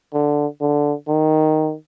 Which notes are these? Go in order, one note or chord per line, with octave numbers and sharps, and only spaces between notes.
D3
D3
D#3